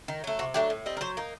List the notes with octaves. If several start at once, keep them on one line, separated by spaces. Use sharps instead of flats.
D#3
F#3 A3
C3 F#4
F#3 A3 D4 G4
A2
G3 C4 D#4
A#4
F#3 C5
A#3 D#4